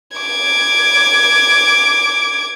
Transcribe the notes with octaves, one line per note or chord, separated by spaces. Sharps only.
D6 G#6